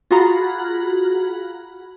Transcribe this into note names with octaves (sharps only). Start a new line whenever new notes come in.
F4 F#4 G#4 F#5 A#5 B5